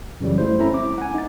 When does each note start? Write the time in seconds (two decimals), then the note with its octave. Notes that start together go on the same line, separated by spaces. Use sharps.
0.21 F#2 C#3 E3 F#3 G3
0.38 A3 E4 C5
0.59 C4 C#4 E4 A4 E5 A#5
0.74 D6
0.98 F#5 G#5
1.14 D#4 A6